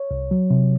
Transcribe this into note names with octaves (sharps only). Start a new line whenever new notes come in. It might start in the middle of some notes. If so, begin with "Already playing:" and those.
Already playing: C#5
C2
F#3
C3